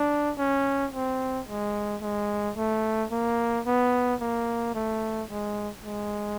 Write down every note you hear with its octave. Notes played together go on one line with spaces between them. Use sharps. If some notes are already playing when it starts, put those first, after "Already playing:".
Already playing: D4
C#4
C4
G#3
G#3
A3
A#3
B3
A#3
A3
G#3
G#3